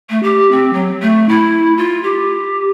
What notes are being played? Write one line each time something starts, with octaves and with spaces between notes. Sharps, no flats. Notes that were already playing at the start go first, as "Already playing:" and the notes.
A3
G4
C4
F#3
A3
E4
F4
G4